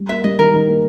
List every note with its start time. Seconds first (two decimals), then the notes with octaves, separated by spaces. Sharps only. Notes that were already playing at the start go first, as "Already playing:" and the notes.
Already playing: G3
0.09 A#3 E5
0.24 G3 D#5
0.39 D#3 A#4
0.54 D#3
0.68 A#3